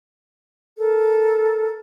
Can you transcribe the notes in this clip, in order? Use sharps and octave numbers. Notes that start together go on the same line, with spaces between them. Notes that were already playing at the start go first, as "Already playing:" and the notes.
A4 A#4